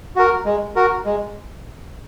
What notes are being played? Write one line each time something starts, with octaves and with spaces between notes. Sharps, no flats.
F#4 A#4
G#3
F#4 A#4
G#3